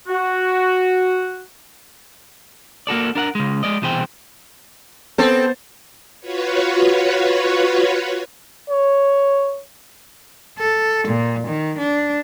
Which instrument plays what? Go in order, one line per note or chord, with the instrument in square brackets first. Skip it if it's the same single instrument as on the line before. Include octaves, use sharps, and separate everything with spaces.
[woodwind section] F#4
[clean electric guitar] A#3 F#4 A4 D5
D4 A#4 F5 F#5
C#3 G#3
G#3 D5 D#5
C2 B2 E3 G#4 C5 G5
[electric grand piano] B3 C5 A6 [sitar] C4 A4
[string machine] F4 F#4 B4 C#5
[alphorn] C#5
[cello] A4
A#2
D#3
D4